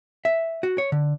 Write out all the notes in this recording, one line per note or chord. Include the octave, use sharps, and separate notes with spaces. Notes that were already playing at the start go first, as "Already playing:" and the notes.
E5
F#4
C#5
D3